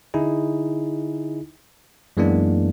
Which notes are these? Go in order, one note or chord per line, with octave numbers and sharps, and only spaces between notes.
D3 D#4 E4 G#4
F#2 E3 G#3 A#3 B3 D4